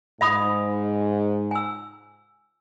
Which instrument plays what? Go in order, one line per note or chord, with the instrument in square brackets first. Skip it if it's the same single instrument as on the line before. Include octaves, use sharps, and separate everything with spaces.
[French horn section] G#2 [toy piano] E5 B5 D#6
[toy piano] G#5 E6